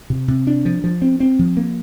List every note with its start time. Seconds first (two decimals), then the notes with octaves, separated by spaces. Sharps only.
0.10 C3
0.28 C3
0.47 D4
0.65 F3
0.84 F3
1.02 C4
1.20 C4
1.39 F3
1.57 A#3